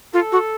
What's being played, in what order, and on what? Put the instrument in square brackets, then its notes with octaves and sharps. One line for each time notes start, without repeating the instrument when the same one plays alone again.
[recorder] F4 [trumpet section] A4
[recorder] F#4